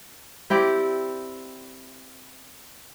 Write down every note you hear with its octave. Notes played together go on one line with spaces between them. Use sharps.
C4 E4 G4 D5